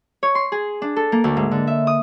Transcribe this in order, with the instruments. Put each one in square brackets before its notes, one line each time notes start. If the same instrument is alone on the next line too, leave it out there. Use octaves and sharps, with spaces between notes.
[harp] C#5
C6
G#4
D4
A4
A#3
D2
G#2
D3
E5
D#6